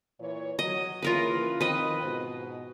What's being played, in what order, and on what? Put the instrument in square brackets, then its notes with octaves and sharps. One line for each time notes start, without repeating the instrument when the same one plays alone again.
[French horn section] A#2 E3 C#5
[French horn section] F#3 [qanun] D#5
[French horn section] C#3 E3 A#3 [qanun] F4 A#4 B4
[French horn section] D#3 F3 C4 [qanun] B4 D#5
[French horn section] G#2 B2